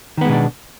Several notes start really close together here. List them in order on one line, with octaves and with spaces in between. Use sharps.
D#3 B3 G#3 B2 D4